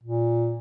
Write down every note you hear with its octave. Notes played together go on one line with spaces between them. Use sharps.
A#2